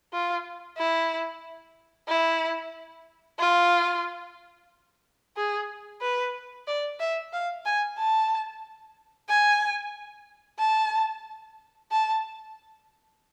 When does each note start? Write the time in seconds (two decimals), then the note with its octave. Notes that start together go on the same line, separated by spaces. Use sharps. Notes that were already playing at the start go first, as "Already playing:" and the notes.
0.13 F4
0.78 E4
2.09 E4
3.39 F4
5.37 G#4
6.02 B4
6.68 D5
7.00 E5
7.33 F5
7.66 G#5
7.98 A5
9.29 G#5
10.60 A5
11.92 A5